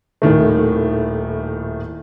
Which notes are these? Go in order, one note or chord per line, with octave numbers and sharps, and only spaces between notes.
D#1 A2 D#3 A3